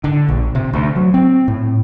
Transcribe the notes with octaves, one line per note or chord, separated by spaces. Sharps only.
D3
A#1
C3
D2
F#3
C4
A2